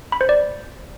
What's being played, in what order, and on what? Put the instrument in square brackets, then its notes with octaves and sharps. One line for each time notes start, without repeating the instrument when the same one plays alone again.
[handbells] B5
C5
D5